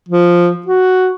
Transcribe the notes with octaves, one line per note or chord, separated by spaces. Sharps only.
F3
F#4